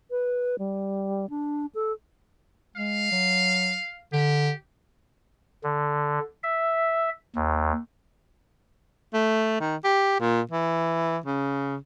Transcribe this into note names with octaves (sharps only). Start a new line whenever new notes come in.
B4
G3
D4
A4
G#3 F5
F#3
D3 G4
D3
E5
D#2
A3
D#3
G4
A#2
E3
C#3